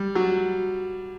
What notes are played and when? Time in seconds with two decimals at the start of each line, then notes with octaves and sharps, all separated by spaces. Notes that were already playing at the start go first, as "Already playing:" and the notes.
Already playing: G3
0.15 F#3